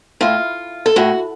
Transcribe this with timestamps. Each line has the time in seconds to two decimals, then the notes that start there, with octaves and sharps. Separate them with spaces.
0.21 A2 F4
0.86 A4
0.96 A2 F#4